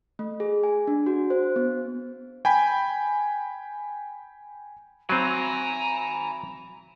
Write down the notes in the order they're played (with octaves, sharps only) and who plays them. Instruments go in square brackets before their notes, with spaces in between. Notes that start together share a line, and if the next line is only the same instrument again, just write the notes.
[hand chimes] A3
G#4
G#5
D4
F#4
C5
B3
[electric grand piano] G5 G#5 B5
[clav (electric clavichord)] F#3 C4 [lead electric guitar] G#5 B5 [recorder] A#5